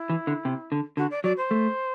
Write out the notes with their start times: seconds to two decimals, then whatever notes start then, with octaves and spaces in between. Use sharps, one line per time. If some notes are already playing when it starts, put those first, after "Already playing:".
Already playing: E4
0.10 E3
0.27 D3
0.45 C3
0.72 D3
0.97 D3 F#4
1.11 D5
1.24 F#3 D5
1.37 C5
1.51 A3